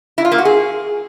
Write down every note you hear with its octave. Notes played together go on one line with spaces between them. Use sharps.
E4
F4
A#3
F#4
G#4